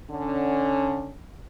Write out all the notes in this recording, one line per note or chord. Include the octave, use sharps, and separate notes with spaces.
D3 C#4